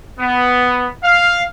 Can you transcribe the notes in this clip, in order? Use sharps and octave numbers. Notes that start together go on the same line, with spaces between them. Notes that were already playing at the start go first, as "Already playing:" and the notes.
B3
F5